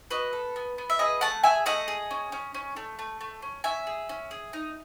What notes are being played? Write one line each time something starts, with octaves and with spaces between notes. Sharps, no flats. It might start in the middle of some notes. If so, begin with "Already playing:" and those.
F#4 B4 D#5
A4
B3
B3
E5
G#4 B4 D#5
A3 F#5 A5
G#4 E5 G#5
A3 D#5 F#5
G#4
C#4
C#4
C#4
A3
A3
A3
C#4
C#4 E5 G#5
G#4
C#4
G#4
D#4